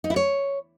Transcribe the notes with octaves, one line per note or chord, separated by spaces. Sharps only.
D#4
E4
C#5